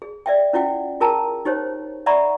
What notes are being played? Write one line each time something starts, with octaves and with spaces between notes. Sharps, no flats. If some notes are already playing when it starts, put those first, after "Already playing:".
G#4
D5 E5 G5
C#4 E4 F4 F#5 G5
F4 G#4 A#4 G5 A5 A#5
D#4 G4 C5 C#5
D5 E5 F#5 A#5 B5 C#6